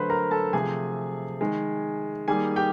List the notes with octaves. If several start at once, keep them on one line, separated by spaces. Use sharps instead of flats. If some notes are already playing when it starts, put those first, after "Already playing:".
Already playing: D3 F#3 A3 B4 C5 B5 C6
A#4 A#5
A4 A5
C3 F3 A3 G#4 G#5
D#3 G#3
D#3 G3 A#3 G#4 G#5
G4 G5